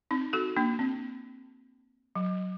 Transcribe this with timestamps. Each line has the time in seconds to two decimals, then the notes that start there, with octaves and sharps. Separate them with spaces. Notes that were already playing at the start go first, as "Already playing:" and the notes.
0.11 C4 D#4
0.33 F#4 A4
0.56 A#3 D4
0.79 C4
2.15 F#3